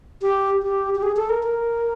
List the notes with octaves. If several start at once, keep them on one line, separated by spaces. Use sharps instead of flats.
G4
G4
G4
G#4
A4
A#4
A#4